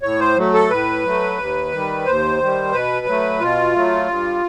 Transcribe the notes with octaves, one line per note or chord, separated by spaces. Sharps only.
A2 C#5
C5
F#3 A3
A4
A2 B4
F#3 A3
D#2
D#3 G3
D#2 C5
D#3 G3
B2 B4
F#3 A3
B2 F4
F#3 A3
G2